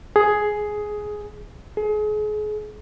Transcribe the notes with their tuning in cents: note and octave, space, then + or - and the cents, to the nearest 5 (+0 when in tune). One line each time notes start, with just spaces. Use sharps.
G#4 +10
G#4 +35